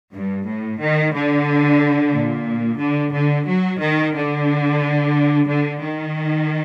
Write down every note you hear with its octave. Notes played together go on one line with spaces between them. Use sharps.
G2
A2
D#3
D3
A#2
D3
D3
F#3
D#3
D3
D3
D#3